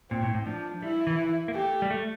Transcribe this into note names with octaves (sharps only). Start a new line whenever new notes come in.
A#2 C4
A2
A2
F3 D4
G3 E4
E3
E3
A#3
A3 G4
G3
A3